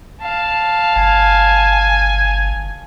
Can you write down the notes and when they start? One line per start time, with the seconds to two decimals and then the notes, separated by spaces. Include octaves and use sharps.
0.22 F5 A5
0.96 G1 G#5